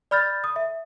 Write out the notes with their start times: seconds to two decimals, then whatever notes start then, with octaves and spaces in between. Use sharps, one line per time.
0.11 D5 B5 F6 G6 A6
0.44 D#6
0.56 E5